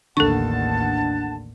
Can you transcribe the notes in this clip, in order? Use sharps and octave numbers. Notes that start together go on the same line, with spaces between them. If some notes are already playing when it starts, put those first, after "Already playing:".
A1 D#2 D3 A4 F#5 A5 C#6